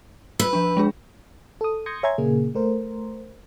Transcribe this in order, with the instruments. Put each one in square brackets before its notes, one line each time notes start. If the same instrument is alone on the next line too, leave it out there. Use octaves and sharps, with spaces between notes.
[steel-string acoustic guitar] B4 [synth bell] E6
[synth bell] F3 D4
G#3 D4 G#4
[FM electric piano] A4 D#6
C6 D#6 G6 G#6 A#6 C#7
C#5 E5 G#5 A#5 C6 G#6
A#2 C#3 A#3 G#4
A3 A#4 C5